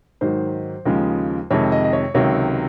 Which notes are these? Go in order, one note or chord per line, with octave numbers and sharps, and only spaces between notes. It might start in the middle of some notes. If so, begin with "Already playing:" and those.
G#2 D#3 F#3 C5
D#2 C#3 F3 G#3
F2 C3 D#3 G#3 C#5
D#5
D#5
C#5
C#2 C3 D#3 F#3 C#5